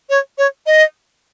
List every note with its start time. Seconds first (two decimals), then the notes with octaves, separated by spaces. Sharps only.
0.10 C#5
0.38 C#5
0.66 D#5